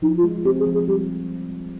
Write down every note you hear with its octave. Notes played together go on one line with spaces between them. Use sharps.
F3 D#4
F4
G#3
C4 G4
G#4
F3
G#4
G3 G4